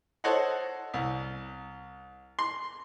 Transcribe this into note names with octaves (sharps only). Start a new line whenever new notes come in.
A4 C5 C#5 D#5 F#5
C2
C6